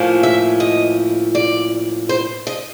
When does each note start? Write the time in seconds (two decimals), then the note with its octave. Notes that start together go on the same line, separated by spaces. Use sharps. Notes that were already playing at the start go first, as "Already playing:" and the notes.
Already playing: A2 F3 A#3 C#4
0.23 E5
0.60 D#5
1.35 D5
2.09 C5
2.47 D#5